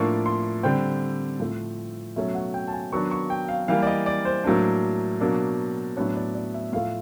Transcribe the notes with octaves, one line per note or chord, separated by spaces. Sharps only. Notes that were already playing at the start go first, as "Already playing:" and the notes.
Already playing: A2 F3 A#3 D4 C#6
C6
D3 G3 C4 G5
A2 F3 A3
B2 F#3 A3 C#4 E5
F#5
G5
A5
G#5
D#3 F#3 B3 D4 C#6
C#6
G5
F5
E3 G3 A#3 F5
D5
D#5
D5
C5
A2 F#3 A#3 D4
B2 F#3 A#3 D4
A2 F#3 B3 D4 C#5
D5
D5
E5
A2 F3 A3 F5